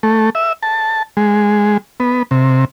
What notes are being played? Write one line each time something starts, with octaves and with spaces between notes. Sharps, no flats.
A3
E5
A5
G#3
B3
C3